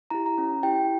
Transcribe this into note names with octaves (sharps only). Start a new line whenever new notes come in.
E4 G4 A#5
A#5
C#4
E4 G4 G5